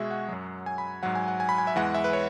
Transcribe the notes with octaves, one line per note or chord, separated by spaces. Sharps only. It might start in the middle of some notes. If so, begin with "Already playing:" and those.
Already playing: B2 G#3 F#4 G#4 E5
F#5
F#2 F#3
G#5
B5
G#2 F#3 F#5
G#5
F#5
G#5
B5
G#5
E5
E2 E3 G#3 F#5
E5
B4
C#5